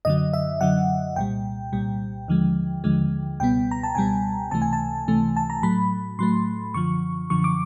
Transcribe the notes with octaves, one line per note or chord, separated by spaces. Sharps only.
F#2 D3 F#3 D#5
E5
F#2 D3 F#3 F#5
C2 A#2 G3 G5
C2 A#2 G3
D#2 D3 F3 G#3
D#2 D3 F3 G#3
C#2 B2 G3 B3 G5
A#5
A5
C#2 B2 G3 B3 G#5
C#2 C3 E3 A3 A5
G#5
A5
C#2 C3 E3 A3
A5
A#5
A2 F#3 A3 B5
A2 F#3 A3 C6
F#2 D3 F3 C#6
F#2 D3 F3 C#6
D6